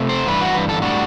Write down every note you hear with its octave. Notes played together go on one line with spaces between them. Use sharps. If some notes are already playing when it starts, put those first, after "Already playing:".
Already playing: C3 A3
C5
G2 E3 B4
F#4
B4
A4
A2 G3 D4 F#4